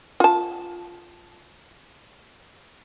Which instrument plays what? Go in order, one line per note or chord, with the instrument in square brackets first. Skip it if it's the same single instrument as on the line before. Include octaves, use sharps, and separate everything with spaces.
[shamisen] F4 A5